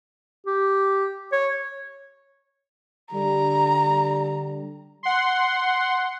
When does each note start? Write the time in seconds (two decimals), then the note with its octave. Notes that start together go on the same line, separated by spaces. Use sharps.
0.46 G4
1.32 C#5
3.13 D3 G3 A#5
5.03 F#5 C6